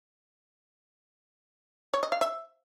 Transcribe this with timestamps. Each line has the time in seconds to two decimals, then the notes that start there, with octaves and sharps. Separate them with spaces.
1.94 C#5
2.03 D#5
2.12 F5
2.21 E5